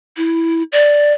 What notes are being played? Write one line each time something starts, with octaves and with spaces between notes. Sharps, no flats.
E4
D5